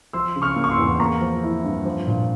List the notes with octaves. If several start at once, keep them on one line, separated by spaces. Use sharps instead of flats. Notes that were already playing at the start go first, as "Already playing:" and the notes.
F3 C6 E6
C#3
C#6 F6
A#3
C#6
C6 E6
E2
A#3 A#5 C#6
F3
E4
G2
F3
A#2